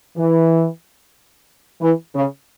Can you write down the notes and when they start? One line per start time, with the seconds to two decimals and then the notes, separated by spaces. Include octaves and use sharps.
0.17 E3
1.81 E3
2.15 C#3